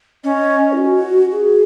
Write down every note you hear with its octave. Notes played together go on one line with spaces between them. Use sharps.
C#4 D#5
E4
F#4
G#4